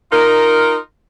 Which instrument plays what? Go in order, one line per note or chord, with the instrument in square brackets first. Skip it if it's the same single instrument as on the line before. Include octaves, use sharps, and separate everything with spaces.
[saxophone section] D#4 F4 A#4